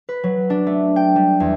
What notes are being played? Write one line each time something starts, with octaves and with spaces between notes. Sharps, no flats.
B4
F#3
D4
A3
G5
G3
E2